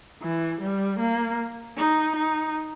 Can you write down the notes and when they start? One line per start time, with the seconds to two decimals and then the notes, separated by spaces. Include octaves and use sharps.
0.22 E3
0.61 G3
0.99 A#3
1.78 D#4
2.16 D#4